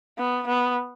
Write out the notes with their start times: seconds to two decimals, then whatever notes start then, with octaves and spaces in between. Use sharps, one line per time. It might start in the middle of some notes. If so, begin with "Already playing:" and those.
0.18 B3
0.47 B3